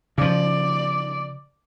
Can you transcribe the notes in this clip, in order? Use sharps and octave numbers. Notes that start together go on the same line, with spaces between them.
C#3 F3 D5